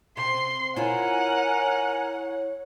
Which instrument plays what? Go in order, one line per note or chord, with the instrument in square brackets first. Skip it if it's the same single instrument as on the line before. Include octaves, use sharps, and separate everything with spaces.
[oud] C3 [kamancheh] C6
[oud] E4 F4 [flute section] A#4 G#5 A#5 [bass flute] C#5 [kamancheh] F#5